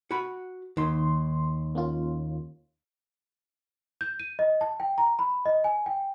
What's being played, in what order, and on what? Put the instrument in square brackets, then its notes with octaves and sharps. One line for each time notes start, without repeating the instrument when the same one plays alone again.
[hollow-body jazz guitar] F#4 B5
[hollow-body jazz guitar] D#2 [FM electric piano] D#3 C6
[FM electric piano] A#3 C#4 F4
[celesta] G6
D#7
D#5
A5
G5
A#5
B5
D#5
G#5
G5